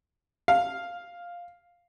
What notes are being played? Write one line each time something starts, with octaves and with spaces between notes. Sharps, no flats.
F5